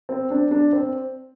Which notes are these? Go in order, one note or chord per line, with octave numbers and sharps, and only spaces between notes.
C4
D4
D4
C4